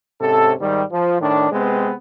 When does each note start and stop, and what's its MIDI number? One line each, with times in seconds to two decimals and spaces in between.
0.21 0.53 44
0.21 0.53 48
0.21 0.53 61
0.21 0.53 69
0.60 0.83 44
0.60 0.83 51
0.60 0.83 55
0.91 1.18 53
1.21 1.51 45
1.21 1.51 51
1.21 1.51 62
1.51 1.93 48
1.51 1.93 56
1.51 1.93 59
1.51 1.93 60
1.51 1.93 71